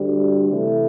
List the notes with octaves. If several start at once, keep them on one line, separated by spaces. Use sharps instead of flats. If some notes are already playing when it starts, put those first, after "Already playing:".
Already playing: D2 D3 G3
C3 E3 A3